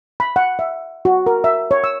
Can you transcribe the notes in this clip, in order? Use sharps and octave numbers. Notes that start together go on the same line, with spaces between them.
B5
F#5
E5
F#4
A#4
E5
C#5
E6